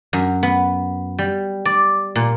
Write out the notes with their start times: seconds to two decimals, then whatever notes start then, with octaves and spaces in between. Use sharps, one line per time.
0.13 F#2
0.43 B3
1.18 G3
1.65 D5
2.15 A#2